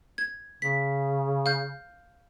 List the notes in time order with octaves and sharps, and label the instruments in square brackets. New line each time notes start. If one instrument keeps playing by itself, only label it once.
[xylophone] G#6
[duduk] C#3 [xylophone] B6
[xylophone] F5 F6 G6